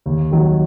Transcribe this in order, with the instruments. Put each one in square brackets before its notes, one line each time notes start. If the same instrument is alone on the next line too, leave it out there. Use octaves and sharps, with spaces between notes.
[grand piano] D#2
D#3 F#3